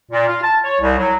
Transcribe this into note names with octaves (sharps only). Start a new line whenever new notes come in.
A#2
F4
A5
C#5
C2
F#3